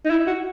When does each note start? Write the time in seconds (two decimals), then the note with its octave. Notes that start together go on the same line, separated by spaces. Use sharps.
0.05 D#4
0.10 E4
0.27 F#4